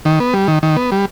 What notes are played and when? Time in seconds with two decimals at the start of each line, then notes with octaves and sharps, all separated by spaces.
0.05 D#3
0.20 B3
0.34 G3
0.48 D#3
0.63 D#3
0.77 B3
0.92 G3